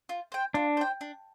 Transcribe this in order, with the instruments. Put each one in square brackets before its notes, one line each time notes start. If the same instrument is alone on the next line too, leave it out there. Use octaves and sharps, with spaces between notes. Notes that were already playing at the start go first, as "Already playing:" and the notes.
[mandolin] F4
C5 G5
[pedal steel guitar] D4 [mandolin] F4
[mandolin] C5 G5
D4